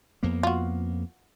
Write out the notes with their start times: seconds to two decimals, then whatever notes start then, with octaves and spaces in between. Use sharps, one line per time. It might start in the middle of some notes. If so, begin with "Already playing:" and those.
0.23 F2 A#3 B3
0.43 F4 F#4